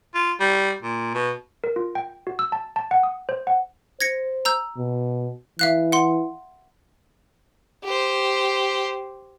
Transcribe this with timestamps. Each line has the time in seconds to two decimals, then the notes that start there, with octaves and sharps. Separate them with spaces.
0.15 F4
0.40 G3
0.83 A#2
1.14 B2
1.64 A#4
1.76 F4
1.95 G5
2.27 F#4
2.39 E6
2.52 A5
2.76 A5
2.91 F#5
3.03 D#6
3.29 C5
3.47 F#5
4.01 C5 G#6 A#6 C#7
4.45 A#5 E6 G6
4.77 B2
5.59 E3 E5 F5 F#6
5.92 F#5 C6
7.84 G4 C5